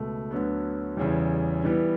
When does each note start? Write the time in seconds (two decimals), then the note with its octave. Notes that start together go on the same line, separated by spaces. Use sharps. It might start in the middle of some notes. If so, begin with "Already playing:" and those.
Already playing: C#2 B2 A3
0.31 D2 D3 F#3 B3
0.97 E2 C#3 E3 G3
1.64 E3 G3 B3